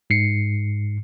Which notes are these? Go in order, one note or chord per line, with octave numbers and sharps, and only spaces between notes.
G#2 C7 C#7